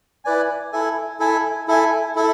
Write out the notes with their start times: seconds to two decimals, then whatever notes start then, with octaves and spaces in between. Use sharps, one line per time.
0.25 E4 B4 D5 G#5
0.72 E4 A4 E5 G#5
1.20 E4 A4 E5 G#5
1.68 E4 A4 E5 G#5
2.15 E4 A4 E5